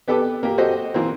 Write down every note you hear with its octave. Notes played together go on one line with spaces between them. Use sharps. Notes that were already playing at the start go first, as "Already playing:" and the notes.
B3 G4 A4 B4 D6
A#3 G4
F#4 G4 A4 C5 D#5
E3 A#3 C4